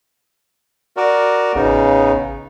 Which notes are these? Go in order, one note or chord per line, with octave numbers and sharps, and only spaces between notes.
F#4 A#4 D5
A1 C#3 B3 D#4